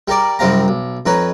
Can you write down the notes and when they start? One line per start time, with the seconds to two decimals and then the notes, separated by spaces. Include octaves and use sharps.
0.08 G3 A#4 D5
0.39 C2 F#2 G3 C4 F5 A#5
0.68 B1
1.06 F2 D#4 B4 C#5